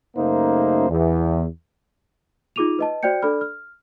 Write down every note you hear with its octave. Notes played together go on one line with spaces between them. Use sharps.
F#2 C#3 A3 A#3 D#4 C5
E2
D#4 F4 G#4 D6 D#7 F7
B4 D#5 A5
F#4 C5 D5 G5 G6 C#7
D4 A4 D5 B5 F6
F6